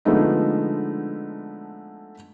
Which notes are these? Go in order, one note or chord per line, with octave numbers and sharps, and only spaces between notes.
D3 F3 G#3 A3 B3 D#4